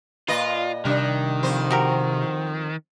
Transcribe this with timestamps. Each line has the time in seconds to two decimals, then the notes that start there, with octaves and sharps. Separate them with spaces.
0.28 A#2 F4 B4 D#5
0.85 C3 D#3 G3 D4
1.43 F2 C5
1.71 F#4 G4 A#4